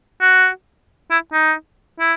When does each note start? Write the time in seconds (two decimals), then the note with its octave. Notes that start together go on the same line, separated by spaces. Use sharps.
0.22 F#4
1.11 E4
1.33 D#4
2.00 E4